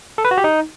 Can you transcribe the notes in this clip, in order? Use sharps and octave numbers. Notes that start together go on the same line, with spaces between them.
A4
B4
F#4
G4
D#4